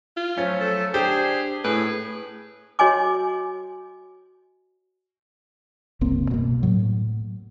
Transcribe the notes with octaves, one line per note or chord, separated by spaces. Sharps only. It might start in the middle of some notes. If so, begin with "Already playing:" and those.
F4
F3 F#3 A3 C#4
A4
D4 G4 G#4 C5
A2 G#4 B4
F#4 C#5 D#5 G#5 D6
F#1 C2 A#3 C4
B2 A#3
A2 F#3